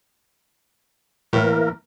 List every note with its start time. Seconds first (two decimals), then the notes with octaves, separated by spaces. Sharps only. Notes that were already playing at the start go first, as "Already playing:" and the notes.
1.33 A2 E3 A#3 A#4